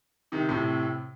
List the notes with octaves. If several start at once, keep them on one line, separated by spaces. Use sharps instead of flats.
C3 D#3
A2 C3